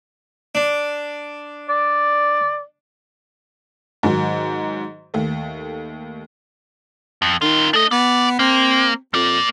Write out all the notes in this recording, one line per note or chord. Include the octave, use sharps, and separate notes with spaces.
D4
D5
G#2 D#3 F#3
D#2 A3
F2
D#3 D#4 F4
A3 D4 D#5
B3 D5
A#3 C4
F2 A#3 D5